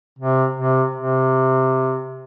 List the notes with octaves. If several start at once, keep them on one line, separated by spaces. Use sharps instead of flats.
C3
C3
C3